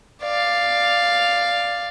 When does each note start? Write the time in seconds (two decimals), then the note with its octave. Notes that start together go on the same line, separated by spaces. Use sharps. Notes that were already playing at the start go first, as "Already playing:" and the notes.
0.23 D5 F5